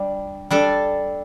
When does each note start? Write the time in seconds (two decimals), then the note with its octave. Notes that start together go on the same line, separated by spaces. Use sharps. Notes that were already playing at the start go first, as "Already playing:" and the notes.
Already playing: G3 D4
0.51 G3 D4 A4